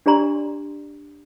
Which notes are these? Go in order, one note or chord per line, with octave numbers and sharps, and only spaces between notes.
D4 G4 D5 A#5 C6 C#6